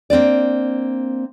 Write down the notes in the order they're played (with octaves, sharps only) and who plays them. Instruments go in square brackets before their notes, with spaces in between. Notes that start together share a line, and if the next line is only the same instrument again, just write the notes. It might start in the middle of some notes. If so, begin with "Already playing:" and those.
[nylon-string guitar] A#3 C4 D4 D5